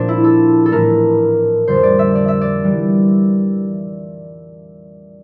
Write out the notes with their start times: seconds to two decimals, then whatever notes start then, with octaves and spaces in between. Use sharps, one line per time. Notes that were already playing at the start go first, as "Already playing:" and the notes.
Already playing: A#2 F3 C4 D4
0.08 E4
0.24 A4
0.66 A4
0.72 A2 E3 A3 D4 A#4
1.67 F2 D3 G3 D4 C5
1.83 D5
1.99 E5
2.15 D5
2.28 E5
2.41 D5
2.63 E3 G3